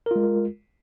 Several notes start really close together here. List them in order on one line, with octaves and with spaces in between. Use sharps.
A#4 F4 G#3